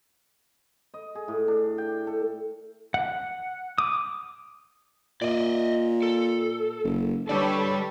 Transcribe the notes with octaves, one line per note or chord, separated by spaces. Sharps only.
D#5
G#4
A2
D4
G5
A4
F#5
D6 D#6
A#2 D5 D#5
A4
F#1
D3 G3 G4 A4 B4 C#5 D5